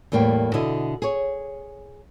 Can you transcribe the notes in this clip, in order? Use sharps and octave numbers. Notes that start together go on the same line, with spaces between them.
E2 A2 G3 A#3 G5
B2 D3 E4 D#5
G#4 C#5